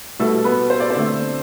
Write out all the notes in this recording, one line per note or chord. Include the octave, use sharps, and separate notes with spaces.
B2 G3 A3 A4
B3 B4
C5
D5
C4 C5
D3 A3